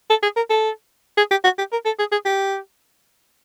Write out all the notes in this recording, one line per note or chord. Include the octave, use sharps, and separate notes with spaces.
A4
G#4
A#4
A4
G#4
G4
F#4
G4
A#4
A4
G#4
G#4
G4